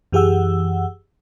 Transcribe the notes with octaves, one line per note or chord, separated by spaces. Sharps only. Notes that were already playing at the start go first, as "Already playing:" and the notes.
F#2 E3 G4 G#4 F#5 E6